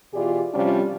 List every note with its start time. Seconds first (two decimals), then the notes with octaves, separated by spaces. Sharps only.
0.14 B2 E3 F4 G4 G#4 D5
0.54 C3 F3 G3 C#4 D4 F4